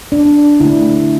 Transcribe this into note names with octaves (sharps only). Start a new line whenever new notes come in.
D4
D3 A3 E4